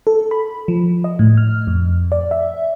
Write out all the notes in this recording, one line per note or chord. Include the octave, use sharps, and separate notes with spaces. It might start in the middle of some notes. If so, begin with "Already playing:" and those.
A4
B5
F3
D#5
A2
F6
F2
D5
E5